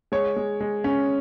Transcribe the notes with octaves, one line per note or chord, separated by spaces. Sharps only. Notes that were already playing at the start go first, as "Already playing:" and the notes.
G#3 C#5
G#3
G#3
C#4